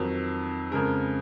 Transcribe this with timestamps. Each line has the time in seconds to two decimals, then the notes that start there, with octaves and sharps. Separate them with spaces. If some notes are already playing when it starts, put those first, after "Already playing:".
Already playing: F2 D#3 F#3
0.71 F2 C#3 G#3 A#4